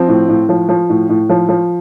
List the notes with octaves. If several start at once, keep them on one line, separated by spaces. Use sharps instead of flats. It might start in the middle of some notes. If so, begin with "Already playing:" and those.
Already playing: F3 C4
A2
A2
F3
F3
A2
A2
F3
F3